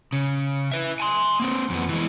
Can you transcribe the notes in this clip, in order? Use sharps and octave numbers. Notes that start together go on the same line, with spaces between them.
C#3
B4 E5
G#5 C6
A#3 C4
F2 B3
E3 G#3